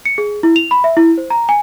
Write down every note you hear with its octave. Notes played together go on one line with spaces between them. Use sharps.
C#7
G#4
E4
F7
B5
E5
E4
C5
A#5
G#5